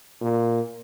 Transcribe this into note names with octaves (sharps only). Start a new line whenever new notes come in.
A#2